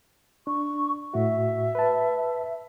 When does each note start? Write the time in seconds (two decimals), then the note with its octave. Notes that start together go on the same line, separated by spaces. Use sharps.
0.47 D4 C#6
1.14 A2 F#4 E5
1.75 B4 A5